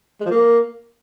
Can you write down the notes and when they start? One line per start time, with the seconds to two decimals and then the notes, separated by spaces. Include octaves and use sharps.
0.20 G#3
0.26 F3
0.31 A#3